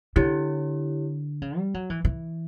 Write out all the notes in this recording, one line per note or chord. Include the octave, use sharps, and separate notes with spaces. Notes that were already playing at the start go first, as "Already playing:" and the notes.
D3 E4 G4 C#5
C#3
G3
F#3
E3
E3